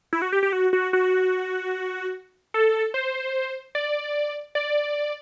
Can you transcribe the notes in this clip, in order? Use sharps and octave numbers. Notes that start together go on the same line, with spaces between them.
E4
F#4
G4
G4
F#4
F#4
F#4
A4
C5
D5
D5